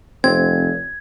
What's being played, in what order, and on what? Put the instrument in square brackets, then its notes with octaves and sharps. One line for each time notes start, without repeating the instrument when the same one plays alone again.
[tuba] F1 [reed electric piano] C4 [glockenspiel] G#6